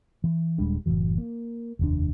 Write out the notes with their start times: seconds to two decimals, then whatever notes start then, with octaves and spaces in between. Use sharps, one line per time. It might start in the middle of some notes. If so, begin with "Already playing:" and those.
0.24 E3
0.58 D#1 G3 G#3 D4
0.86 F#1 A2 E3 F#3
1.18 A#3
1.79 F1 D#2 D4